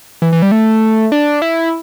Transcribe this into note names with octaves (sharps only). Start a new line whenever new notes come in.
E3
E3
G3
A3
D4
E4